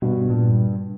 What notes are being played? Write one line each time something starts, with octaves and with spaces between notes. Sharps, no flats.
G2 B2
G2 A#2